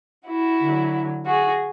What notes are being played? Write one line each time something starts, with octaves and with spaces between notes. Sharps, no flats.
E4 F#4
D3 F#3
F#4 G#4